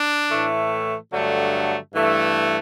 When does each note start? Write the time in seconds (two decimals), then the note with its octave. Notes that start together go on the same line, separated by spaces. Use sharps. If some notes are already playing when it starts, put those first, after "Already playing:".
Already playing: D4
0.31 A2 E3 A3
1.13 G2 D3 F#3 A3
1.94 G2 E3 A3